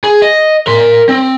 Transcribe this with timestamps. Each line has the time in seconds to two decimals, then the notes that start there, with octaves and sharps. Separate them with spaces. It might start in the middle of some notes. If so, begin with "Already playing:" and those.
0.04 G#4
0.22 D#5
0.67 A#4 C6
1.09 C4